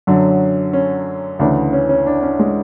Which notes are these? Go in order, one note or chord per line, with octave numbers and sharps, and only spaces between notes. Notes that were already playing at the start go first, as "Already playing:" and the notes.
F#2 D3 F#3
C#4
D2 C#3 E3 D4
C#4
C#4
D4
C#4
G#3